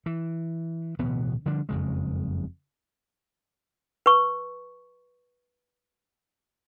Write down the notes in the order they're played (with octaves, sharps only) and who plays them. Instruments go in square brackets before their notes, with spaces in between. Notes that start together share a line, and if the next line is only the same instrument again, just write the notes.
[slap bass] E3
D1 B2 E3 B3
D3 F3 G3 D4
F#1 F2 C#3 G#3
[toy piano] B4 C#6